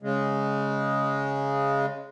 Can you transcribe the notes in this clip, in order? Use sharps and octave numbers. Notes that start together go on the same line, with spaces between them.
C#3 G#3